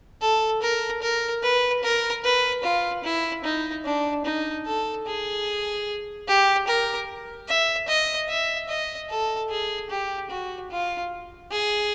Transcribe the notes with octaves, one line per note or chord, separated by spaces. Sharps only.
A4
A#4
A#4
B4
A#4
B4
F4
E4
D#4
D4
D#4
A4
G#4
G4
A#4
E5
D#5
E5
D#5
A4
G#4
G4
F#4
F4
G#4